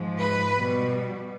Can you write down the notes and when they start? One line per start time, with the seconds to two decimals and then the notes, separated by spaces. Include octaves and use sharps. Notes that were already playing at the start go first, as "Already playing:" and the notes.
Already playing: G#2 F3 G#3
0.21 B4
0.56 B2 G3